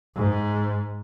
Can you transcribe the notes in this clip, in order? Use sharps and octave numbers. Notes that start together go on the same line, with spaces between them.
G#2